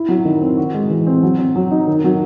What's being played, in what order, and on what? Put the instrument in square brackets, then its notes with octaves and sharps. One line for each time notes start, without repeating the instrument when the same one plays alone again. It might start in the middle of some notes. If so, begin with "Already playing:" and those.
Already playing: [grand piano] E4
F#3
D#3
C4
F#4
G#3
E3
C4
F#3
C4
F#3
D#4
D#3
F#3